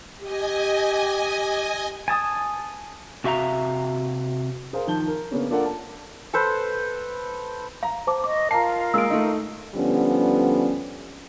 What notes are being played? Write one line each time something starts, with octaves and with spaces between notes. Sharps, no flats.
G4 D#5 G#5
G#5 A5 D#6
C3 F#4 E5 F5 A#5
G#4 A#4 C5 F5
D#3 F3 A5 G6 G7
A#4
C#3 A#3 B3 C#4 D4
A#3 D4 F4 A4 A#4 F#5
A5
A4 B4 C5
F5 A#5
C5 A5 D6
D#5 C#6 D6
F4 A#4 F5 A5 A#5 C7
G#3 A#3 E6 D7
A3 D#4
D3 F3 G3 B3 C#4